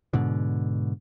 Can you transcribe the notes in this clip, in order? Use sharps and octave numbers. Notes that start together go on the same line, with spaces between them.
G#2 B2 D3